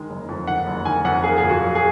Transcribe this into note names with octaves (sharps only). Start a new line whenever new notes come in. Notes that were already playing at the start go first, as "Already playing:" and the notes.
Already playing: D#3 G#3
F#1
F2
D#3 F#5
F#1
D#3 G#5
F2 F#5
A#3 G#4
G#4
A#2
F#4
F#3
G#4